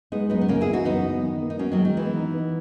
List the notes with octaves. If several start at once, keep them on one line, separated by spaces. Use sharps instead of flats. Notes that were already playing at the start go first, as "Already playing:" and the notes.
G#3 B3 D#4
F#2 B3 D#4
B3
C#3 A#3 C#4
E4 G#4
E3
D#4 F#4
F#2 B3 D#4
F#2
D#3
A#3
D#4
A#3 C#4 F#4
D#3 F#3
G#3
D#3
E3 B3
D#4
B3